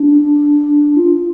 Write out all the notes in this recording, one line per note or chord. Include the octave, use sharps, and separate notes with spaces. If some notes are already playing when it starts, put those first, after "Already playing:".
Already playing: D4
F4